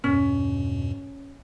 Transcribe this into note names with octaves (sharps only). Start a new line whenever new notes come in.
E2 G2 B2 C#4